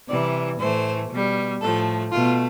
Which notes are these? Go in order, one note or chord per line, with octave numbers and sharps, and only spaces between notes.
C3 E3 G3 D5
A2 E3 A3 C5
B2 G3
A2 F3 A3 A4
B2 A3 F4